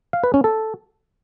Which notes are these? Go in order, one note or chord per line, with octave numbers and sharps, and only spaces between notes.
F5
B4
C#4
A4